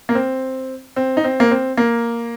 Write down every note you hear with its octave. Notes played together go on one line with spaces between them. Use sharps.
A#3
C4
C4
D#4
C4
A#3
C4
A#3